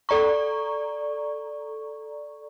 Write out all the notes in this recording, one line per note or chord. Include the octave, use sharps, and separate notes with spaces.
A4 D5 A#5 C#6